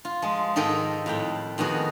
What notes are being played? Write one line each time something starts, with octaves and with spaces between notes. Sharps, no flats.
F4
F3 G#3
G#2 D#3 A4 A#4 D#5 G5
F2 A2 G5
F2 D#3 B3 F#4 G#4